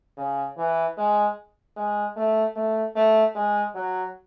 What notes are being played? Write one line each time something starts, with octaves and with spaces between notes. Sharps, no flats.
C#3
E3
G#3
G#3
A3
A3
A3
G#3
F#3